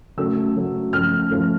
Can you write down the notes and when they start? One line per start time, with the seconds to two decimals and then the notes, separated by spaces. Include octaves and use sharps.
0.17 C#3 F#3 A3 E6
0.56 C#3 F#3 A3
0.93 C#3 F3 A3 F6
1.31 C#3 F3 A3